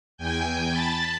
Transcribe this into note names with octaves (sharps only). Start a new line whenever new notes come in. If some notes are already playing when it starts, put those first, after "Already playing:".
E2 G5 G#5 G6
A5 B5 A6